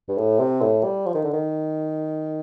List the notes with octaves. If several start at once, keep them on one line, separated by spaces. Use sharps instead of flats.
G2
A2
C3
A2
G3
F3
D#3
D3
D#3